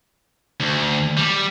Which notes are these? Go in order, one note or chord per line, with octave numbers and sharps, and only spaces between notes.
D2
G3